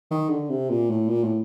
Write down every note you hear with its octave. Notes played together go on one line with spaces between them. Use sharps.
D#3
D3
C3
A#2
A2
A#2
A2